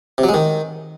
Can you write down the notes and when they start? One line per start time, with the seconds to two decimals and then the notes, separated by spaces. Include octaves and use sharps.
0.18 C3
0.23 F#3
0.29 G#3
0.34 D#3